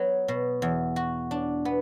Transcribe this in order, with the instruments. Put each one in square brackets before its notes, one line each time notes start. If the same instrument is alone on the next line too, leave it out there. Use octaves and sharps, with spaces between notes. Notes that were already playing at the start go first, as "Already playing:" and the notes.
Already playing: [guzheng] F#3 B3
B2
E2
F#4
D4
B3